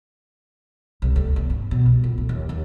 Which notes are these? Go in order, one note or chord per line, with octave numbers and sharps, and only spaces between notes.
C2
D2
E2
G#2
B2
C2
A#2
A3
D#2
D#2